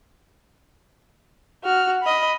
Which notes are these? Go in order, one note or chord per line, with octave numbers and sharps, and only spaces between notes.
F#4 F6
D#5 B5